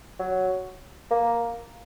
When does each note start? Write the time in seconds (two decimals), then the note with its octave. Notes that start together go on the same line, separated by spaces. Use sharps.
0.20 F#3
1.11 A#3